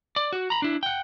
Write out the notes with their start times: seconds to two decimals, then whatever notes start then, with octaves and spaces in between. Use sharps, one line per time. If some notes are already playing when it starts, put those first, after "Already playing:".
0.16 D5
0.33 F#4
0.50 A#5 B5
0.62 D4 E4
0.83 F#5 G5